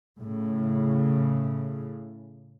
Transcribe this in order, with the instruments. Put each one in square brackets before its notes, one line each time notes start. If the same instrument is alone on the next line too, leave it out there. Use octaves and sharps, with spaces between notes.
[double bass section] A2 C#3